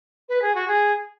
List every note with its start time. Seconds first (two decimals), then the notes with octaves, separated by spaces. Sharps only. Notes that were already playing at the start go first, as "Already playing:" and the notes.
0.29 B4
0.42 G#4
0.55 F#4
0.68 G#4